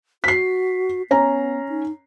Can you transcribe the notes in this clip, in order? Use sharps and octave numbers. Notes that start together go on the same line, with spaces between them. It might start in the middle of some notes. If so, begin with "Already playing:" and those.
F#4 B6 C7
B3 C#4 A#5
D#4